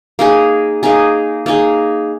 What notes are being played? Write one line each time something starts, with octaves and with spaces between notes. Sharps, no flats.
A#3 D#4 G#4
A#3 D#4 G#4
A#3 D#4 G#4